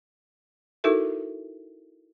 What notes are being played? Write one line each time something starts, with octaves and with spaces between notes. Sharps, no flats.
D#4 E4 F#4 A4 A#4 E5